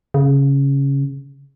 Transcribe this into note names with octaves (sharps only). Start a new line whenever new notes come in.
C#3